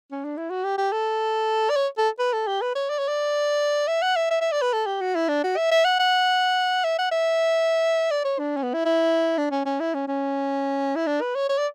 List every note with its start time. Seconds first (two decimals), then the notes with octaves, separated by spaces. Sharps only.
0.11 C#4
0.25 D4
0.37 E4
0.50 F#4
0.64 G4
0.78 G4
0.92 A4
1.70 D5
1.76 C#5
1.98 A4
2.19 B4
2.33 A4
2.47 G4
2.62 B4
2.75 C#5
2.90 D5
2.99 C#5
3.08 D5
3.88 E5
4.02 F#5
4.16 E5
4.31 E5
4.41 E5
4.52 D5
4.62 B4
4.73 A4
4.86 G4
5.01 F#4
5.15 E4
5.29 D4
5.44 F#4
5.57 E5
5.71 E5
5.85 F#5
6.00 F#5
6.84 E5
6.99 F#5
7.12 E5
8.11 D5
8.25 C#5
8.39 D4
8.57 C#4
8.63 B3
8.74 E4
8.85 E4
9.38 D4
9.51 C#4
9.66 C#4
9.80 E4
9.94 C#4
10.08 C#4
10.96 E4
11.07 D4
11.21 B4
11.35 C#5
11.49 C#5
11.58 D5